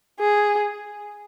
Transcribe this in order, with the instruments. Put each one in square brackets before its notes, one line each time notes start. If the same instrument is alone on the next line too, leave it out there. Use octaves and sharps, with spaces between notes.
[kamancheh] G#4